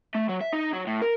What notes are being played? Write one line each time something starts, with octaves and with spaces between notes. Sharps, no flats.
A3
F#3
E5
D#4
F#3
A2
A#4